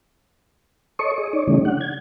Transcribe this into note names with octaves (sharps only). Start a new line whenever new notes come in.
A4 C#5 D#5 C#6
G#4 D#5
D#4 C#5 D5
C#3 E3 G3 A3 C#4 D#4
D4 F#5
G#6